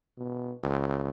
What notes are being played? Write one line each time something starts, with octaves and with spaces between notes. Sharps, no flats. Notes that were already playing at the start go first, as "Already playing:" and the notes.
B2
C#2